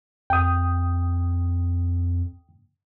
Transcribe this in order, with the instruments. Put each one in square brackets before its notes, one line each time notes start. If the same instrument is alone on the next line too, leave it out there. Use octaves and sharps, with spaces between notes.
[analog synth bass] F2 [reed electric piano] G5 D#6